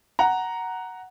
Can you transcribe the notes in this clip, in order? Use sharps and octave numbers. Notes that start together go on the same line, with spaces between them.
F#5 A#5